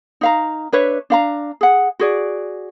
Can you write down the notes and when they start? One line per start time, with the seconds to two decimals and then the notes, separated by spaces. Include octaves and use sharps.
0.21 D#4 F5 A#5
0.72 D4 B4 C#5 E5
1.10 D4 F5 A#5
1.61 G#4 F#5
1.99 F#4 G#4 D5